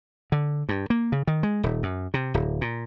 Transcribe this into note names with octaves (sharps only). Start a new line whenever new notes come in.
D3
G2
A#3
C#3
D#3
G#3
D#1
F#2
C3
D1
A#2